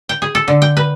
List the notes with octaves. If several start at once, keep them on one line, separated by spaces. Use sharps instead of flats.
G5
G#4
A4
D3
G5
B4